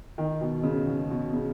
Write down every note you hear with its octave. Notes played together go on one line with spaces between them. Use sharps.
D#3
B2
C#3
B2
B2
C#3